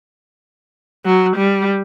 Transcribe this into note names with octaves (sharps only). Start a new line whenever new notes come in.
F#3
G3